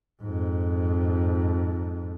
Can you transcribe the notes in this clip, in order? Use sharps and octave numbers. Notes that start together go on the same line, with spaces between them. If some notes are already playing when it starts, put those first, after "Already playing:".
F2 G#2